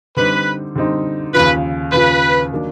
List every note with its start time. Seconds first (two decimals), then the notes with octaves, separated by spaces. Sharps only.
0.17 D3 G3 C4 D#4 B4
0.75 D3 G3 C4 D#4
1.34 D#2 C#3 F3 B4
1.92 D#2 C#3 F3 B4
2.52 D#3 F#3 A#3 D4